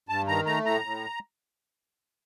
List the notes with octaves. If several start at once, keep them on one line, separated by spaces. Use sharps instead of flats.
G2 A5
D#3 A#5
A3 A#5
A2 A#5
A2